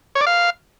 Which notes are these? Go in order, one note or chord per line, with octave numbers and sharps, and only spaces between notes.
C#5
D5
F5